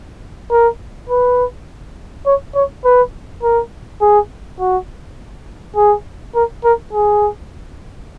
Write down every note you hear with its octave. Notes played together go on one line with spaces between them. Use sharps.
A#4
B4
C#5
C#5
B4
A#4
G#4
F#4
G#4
A#4
A#4
G#4